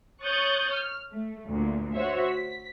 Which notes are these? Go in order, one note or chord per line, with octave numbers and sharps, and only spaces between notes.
C#5 C#6 D#6 F#6 G6 A6
F6
A3
D2 A#2
F#4 C5 C#5 E5
B6